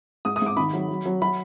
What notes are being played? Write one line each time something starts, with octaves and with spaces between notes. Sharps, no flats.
G#2 D#6
D#6
G#2 D6
D#3 B5
F#3
F#3
F#3
F#3 B5